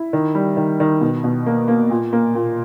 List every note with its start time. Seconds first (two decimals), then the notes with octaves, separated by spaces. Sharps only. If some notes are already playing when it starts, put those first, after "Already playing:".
Already playing: E4
0.13 D#3
0.35 G3
0.57 D#3
0.80 D#3
1.01 B2
1.24 B2
1.46 A#3
1.68 A#3
1.90 A#2
2.13 A#3
2.35 A#2